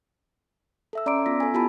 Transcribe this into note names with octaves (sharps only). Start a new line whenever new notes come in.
A4 E5 E6
C#4 D5 A#5 C6 D6 D7
B3 F4 E6 A#6 B6
A4 G#5
B3 E4 F4 G4 A5 B5